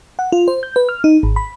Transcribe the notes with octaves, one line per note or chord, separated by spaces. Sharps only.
F#5
F4
C5
G6
B4
F6
D#4
G#1
B5